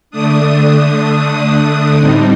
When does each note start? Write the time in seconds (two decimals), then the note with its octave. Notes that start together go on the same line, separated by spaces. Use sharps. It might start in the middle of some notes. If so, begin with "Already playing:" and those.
0.11 D3 A3 D4 D#6
1.98 A2 G3 C4 D#4